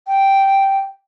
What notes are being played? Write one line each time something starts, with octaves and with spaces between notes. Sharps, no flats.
G5